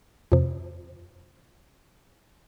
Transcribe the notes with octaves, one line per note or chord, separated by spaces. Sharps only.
F2 C3